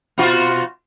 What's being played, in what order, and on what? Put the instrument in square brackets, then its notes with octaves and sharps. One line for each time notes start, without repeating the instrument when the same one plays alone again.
[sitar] B2 F4 F#4